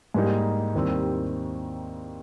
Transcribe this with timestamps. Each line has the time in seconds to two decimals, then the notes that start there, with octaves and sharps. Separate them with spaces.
0.14 G#2 G3 A#3 D#4
0.75 D#2 D#3 G3 C4